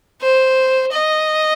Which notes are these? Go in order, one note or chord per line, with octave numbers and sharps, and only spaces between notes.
C5
D#5